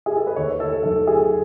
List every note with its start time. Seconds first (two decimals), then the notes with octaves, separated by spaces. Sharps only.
0.06 G#4
0.16 A4
0.27 B4
0.36 D#2 C#5
0.60 A4
0.83 D#3 F#3 A4
1.07 G#4